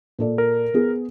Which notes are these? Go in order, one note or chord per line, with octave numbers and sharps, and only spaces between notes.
A#2 A4 D5
A#4
B3 G#4